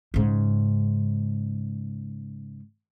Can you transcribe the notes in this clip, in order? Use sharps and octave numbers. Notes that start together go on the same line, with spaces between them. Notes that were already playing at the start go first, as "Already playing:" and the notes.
G#2 C#3